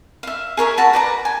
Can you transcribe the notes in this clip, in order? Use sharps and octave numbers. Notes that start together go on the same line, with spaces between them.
E5 F5
G#4 A#4 C#5 E5
F#4 A5 B5
B4 D5 A#5
G#5